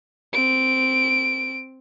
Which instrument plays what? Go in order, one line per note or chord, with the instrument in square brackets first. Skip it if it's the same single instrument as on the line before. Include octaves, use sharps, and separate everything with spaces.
[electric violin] C4 D7